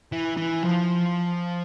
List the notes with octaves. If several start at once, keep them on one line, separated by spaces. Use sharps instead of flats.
E3
E3
F3